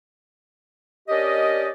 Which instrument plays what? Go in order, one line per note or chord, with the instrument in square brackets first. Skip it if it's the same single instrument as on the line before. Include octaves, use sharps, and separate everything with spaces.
[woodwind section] C#4 D4 G4 A#4 D5 D#5